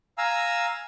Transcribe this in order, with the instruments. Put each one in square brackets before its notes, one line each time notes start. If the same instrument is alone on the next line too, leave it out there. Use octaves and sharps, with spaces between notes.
[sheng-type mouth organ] F5 G#5 A#5 E6